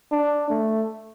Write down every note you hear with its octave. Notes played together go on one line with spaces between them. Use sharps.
D4
A3